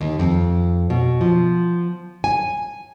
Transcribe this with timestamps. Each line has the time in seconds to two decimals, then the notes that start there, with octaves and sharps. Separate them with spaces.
0.01 D#2
0.19 F2
0.90 B2
1.21 F3
2.24 G#5